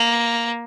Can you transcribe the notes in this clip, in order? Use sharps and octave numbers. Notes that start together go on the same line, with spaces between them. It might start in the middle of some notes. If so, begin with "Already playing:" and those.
Already playing: A#3